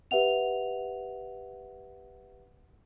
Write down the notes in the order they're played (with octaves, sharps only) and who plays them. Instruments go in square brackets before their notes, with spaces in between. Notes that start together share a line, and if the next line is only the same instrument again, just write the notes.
[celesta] G4 B4 E5 F#5 F7